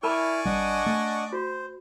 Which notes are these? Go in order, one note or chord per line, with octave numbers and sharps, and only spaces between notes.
E4 A#4 D5 G#5 A5 B5 C#6 F6
G#1 G3 D4 D#5 F#5
A3
F#4 C5